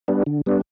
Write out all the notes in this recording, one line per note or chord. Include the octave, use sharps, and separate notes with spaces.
G3 B3 D4
D3
G3 B3 D4